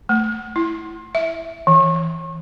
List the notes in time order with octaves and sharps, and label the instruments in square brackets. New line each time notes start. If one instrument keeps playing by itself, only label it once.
[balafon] A3
E4
E5
E3